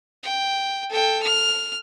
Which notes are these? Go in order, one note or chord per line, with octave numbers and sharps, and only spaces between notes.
G5
A4 G5
F6